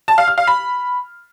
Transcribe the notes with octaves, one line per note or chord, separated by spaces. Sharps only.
A5
F5
F6
F5
B5